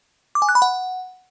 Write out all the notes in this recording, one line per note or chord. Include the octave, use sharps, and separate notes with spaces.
D6
G#5
F#6
B5
F#5